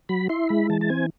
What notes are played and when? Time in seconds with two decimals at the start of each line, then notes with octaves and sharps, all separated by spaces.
0.09 F#3 B5
0.29 E4 C6
0.49 G#3 B5
0.70 E3 A5
0.81 A5
0.89 C4 G#5